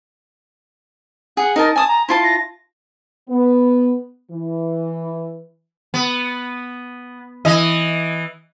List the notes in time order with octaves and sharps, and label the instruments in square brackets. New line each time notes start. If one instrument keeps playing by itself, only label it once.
[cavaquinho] G#4 [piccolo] F#5
[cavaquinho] D#4 A#4 A5 [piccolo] D#5
[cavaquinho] G#5 D#6 [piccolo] A5
[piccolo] A#5
[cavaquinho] E4 F4 A5 [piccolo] C6
[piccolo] A#6
[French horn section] B3
E3
[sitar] B3
E3 D#5